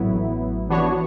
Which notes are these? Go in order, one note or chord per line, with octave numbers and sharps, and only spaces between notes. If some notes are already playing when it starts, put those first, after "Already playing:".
Already playing: A1 A2 F#3 B3 E4
E3 B3 D4 F#4 C#5